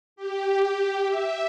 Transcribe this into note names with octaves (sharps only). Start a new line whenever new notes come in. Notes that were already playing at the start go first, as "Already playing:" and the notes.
G4
E5